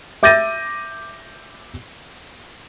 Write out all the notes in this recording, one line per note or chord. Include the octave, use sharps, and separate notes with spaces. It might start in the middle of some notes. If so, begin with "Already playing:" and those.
E5 D6 G6 A6 A#6 D#7